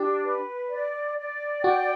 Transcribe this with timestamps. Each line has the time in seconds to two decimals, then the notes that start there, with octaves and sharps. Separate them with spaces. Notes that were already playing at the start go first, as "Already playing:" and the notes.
Already playing: D4 G4
0.23 B4
0.69 D5
1.17 D5
1.64 F#4 G5